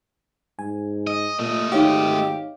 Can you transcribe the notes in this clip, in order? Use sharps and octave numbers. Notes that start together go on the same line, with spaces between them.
G#2 G#5
D#5
A#2 A3 D#5
G#1 D#4 G4 C#5 F5